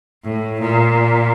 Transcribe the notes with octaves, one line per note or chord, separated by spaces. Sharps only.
A2
A#2